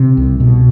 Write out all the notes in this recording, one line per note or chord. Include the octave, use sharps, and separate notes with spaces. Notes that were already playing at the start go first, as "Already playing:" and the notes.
Already playing: C3 C4
C2
B2